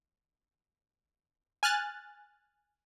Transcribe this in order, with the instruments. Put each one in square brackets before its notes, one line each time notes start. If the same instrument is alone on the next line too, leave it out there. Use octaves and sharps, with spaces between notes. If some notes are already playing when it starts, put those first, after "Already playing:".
[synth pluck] G#5 F6 F#6 A6